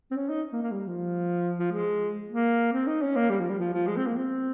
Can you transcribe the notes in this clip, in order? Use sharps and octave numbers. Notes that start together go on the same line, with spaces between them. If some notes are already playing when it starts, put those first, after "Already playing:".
C4
C#4
D#4
A#3
A#3
G3
F3
F3
G#3
A#3
C4
D#4
C#4
A#3
G3
F3
G3
F3
F3
G#3
C4
A#3
C4